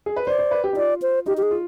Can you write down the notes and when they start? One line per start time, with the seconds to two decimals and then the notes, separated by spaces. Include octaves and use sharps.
0.06 G#4
0.16 B4
0.26 C5 D5
0.39 C5
0.51 B4
0.64 G4
0.73 D#4
0.77 F4 D5
1.02 C5
1.26 D#4 G4
1.37 G4
1.43 G#4
1.51 F4